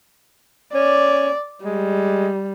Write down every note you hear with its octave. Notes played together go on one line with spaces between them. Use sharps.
C#4 D5
G3 G#3